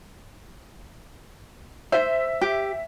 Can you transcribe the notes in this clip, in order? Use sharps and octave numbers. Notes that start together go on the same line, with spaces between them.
C5 E5
G4